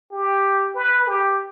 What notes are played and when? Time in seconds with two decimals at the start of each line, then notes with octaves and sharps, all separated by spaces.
0.12 G4
0.75 B4
1.07 G4